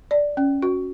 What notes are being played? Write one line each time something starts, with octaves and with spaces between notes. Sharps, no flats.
D5
C#4
F#4